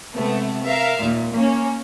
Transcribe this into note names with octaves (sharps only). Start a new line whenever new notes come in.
C3 G#3 A3 B3
A#4 E5 F5
D#2 A#2
A#3 C#4